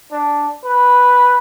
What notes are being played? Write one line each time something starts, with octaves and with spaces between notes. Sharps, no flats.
D4
B4